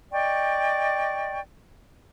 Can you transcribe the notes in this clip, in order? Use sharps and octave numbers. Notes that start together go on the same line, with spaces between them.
D5 D#5 G5 C#6